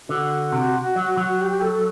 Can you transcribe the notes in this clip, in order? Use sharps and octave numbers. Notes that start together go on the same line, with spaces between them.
D3 F#4
C3
F#3
F#3
G4
G4
A4
A4